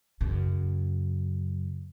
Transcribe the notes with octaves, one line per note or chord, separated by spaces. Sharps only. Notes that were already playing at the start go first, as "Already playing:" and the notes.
F#2 C#3